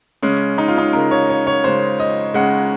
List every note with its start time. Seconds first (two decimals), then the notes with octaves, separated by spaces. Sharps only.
0.22 C#3 G#3 C#4
0.58 D#4
0.68 F4
0.78 D#4
0.93 C#3 G#3 A#4
1.11 C#5
1.29 C#5
1.47 C#5
1.64 C#3 G#3 C5
2.00 D#5
2.34 C#3 G#3 F#5